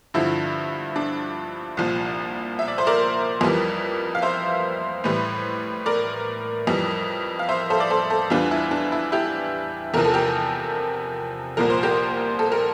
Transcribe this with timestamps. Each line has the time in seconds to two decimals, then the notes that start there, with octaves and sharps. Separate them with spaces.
0.14 G2 D3 F3 E4
0.96 D4
1.77 C2 A#2 F3
2.59 E5
2.68 D5
2.78 C5
2.87 A#4 D5
3.41 F2 E3 G3
4.15 F5
4.22 C5 E5
5.04 A2 E3 G3
5.86 A#4 D5
6.67 F2 E3 G3
7.39 F5
7.49 C5 E5
7.70 A4 C5
7.80 D5
7.90 A4 C5
8.10 A4 C5
8.30 E2 E3 G3 D4 F4
8.51 E4
8.71 D4
8.92 E4
9.12 E4 G4
9.94 E2 C3 F3 A#4
10.04 A4
10.14 G4 A#4
11.57 C2 A#2 F3 A#4
11.70 C5
11.83 G4 A#4
12.39 A4
12.52 A#4